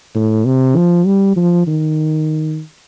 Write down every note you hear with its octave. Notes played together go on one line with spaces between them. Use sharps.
A2
C3
F3
G3
F3
D#3